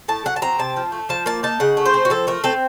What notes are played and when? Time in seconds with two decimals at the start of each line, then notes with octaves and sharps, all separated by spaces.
0.08 A2 A5
0.25 F#3 F#5
0.36 A5
0.42 C4 A#5
0.59 C3 A5
0.76 F3
0.92 A3
1.09 F3 A5
1.26 A#3 A5
1.43 D#4 A5
1.60 C#3 F#5
1.77 A3
1.86 C5
1.94 C4
2.05 F#4
2.10 F3 A4
2.27 A3 A#4
2.44 C4 A4